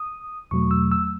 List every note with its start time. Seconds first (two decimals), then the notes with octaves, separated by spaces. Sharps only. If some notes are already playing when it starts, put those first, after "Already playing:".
Already playing: D#6
0.51 E2 B2 F#3 A3 C#6
0.71 E6
0.91 E6